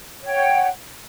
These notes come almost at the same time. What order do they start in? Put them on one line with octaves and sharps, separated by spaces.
C#5 G5 F#5